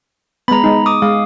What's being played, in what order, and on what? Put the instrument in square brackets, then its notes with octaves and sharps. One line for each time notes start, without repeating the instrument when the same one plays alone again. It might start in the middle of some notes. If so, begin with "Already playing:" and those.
[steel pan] G#3 B3 [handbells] A#5 B5
[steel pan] G#3 D#4
[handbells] D6 D#6
[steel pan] G#3 [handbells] F5